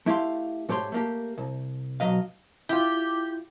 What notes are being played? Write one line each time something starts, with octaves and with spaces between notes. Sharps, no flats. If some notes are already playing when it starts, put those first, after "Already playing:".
A3 E4 G4 F5 C6
G#2 A3 G4 C#5 C6
A3 A#3 G4
C2
B1 F#3 D#5 F5
E4 F4 G4